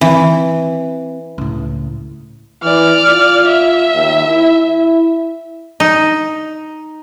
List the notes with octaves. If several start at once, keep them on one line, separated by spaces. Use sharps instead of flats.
E3 C4
C#2 A2
E3 D5 F6
F4
E5
D#2
E4
E4
D#4